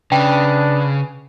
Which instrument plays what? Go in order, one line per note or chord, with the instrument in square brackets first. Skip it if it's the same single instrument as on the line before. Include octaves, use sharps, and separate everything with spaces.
[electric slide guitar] C#3 [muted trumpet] D4 [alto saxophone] B4 [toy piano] G5